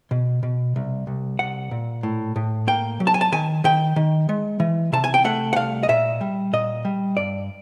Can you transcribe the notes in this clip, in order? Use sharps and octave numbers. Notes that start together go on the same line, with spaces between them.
B2
B2
C2
C2
C2 F#5
A#2
A2
A2
A#3 G5
F#3
A5
G#5
A5
D#3 G#5
D#3 G5
D#3
G#3
E3
C3 A5
G#5
G5
A3 F#5
F#5
C2 F5
D#5
A#2 E5
G3
A#2 D#5
G3
G2 D5